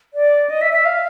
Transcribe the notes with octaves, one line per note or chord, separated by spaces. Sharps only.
D5
D#5
E5
E5
F5